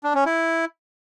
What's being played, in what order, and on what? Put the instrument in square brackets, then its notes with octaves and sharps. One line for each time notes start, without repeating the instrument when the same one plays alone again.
[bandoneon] D4
C#4
E4